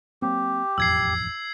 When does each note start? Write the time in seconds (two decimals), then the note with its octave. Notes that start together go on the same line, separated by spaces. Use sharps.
0.22 F#3 A#3 C4 G4
0.78 E1 A1 F2 E6 G#6 C7